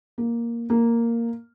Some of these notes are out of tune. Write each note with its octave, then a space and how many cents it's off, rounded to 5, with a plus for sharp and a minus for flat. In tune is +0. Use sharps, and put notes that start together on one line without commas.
A#3 +5
A#3 -5